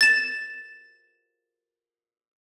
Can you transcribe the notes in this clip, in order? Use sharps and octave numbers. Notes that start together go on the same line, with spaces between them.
A6 E7